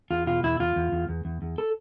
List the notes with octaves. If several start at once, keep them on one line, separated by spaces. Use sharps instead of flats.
E2 F4
B2 F4
E2 E4
E2 F4
E2
E2
E2
E2
E2
A4